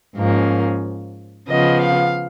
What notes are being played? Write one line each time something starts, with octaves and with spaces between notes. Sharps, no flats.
G#2 F3 A#3 C#4
C#3 F3 B3 D#5
F5